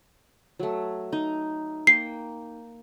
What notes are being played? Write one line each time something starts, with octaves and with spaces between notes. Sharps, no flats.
F#3 A3
D#4
A#3 G5 C7